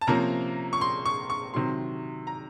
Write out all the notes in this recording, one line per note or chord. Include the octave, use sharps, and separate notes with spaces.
A5
C3 F3 A#3 C#4 A#5
C#6
C6
C#6
C#6
C3 D#3 F#3 C6
A#5